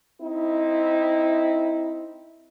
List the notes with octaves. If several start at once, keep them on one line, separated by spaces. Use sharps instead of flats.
C4 D#4 E4